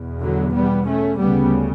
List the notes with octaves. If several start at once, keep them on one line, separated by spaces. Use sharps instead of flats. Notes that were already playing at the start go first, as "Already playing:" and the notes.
Already playing: E2 B2
D3 F#3
G3 B3
A3 C#4
D2 C#3 G3 B3